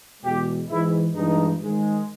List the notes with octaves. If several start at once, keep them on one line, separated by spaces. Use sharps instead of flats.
E2 B2 G#3 G4
G#2 E3 G#3 E4
G2 E3 G#3 D#4
G#2 D#3 G#3